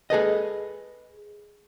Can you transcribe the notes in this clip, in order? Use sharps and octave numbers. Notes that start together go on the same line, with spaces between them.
G#4 A4 B4 D#5